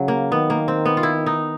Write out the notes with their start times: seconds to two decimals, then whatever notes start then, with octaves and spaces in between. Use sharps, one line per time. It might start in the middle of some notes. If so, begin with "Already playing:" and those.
Already playing: C#3 F#3
0.08 A#3
0.32 D#3 B3
0.50 A#3
0.68 C4
0.86 B3
0.97 F4
1.03 E4
1.26 D#4